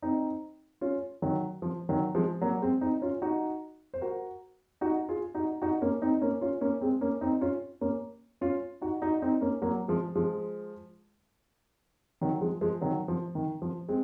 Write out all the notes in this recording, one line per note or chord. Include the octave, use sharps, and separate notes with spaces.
C4 D#4
C#4 F4
D#3 F#3
F3
D#3 F#3
F3 G#3
F#3 A#3
G#3 C4
C4 D#4
C#4 F4
D#4 F#4
C5
F#4 A#4
D#4 F#4
F4 G#4
D#4 F#4
D#4 F#4
A#3 C#4
C4 D#4
A#3 C#4
C#4 F4
A#3 C#4
G#3 C4
A#3 C#4
C4 D#4
C#4 F4
A#3 C#4
C#4 F4
D#4 F#4
D#4 F#4
C4 D#4
A#3 C#4
F#3 A#3
F3 G#3
F3 G#3
D#3 F#3
F3 G#3
F3 G#3
D#3 F#3
F3
D#3
F3
G#3 C4